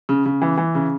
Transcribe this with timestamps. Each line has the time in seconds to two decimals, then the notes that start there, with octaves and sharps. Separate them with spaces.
0.09 C#3
0.26 C#3
0.42 E3
0.57 E3
0.75 C#3